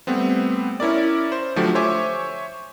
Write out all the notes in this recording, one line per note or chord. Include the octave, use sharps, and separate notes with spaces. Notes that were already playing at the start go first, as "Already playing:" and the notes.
G3 A3 B3 C4
C#4 E4 A#4 D5
C5
D3 F3 F#3 A3 D4 G4
C5 C#5 E5 G#5 C#6 D6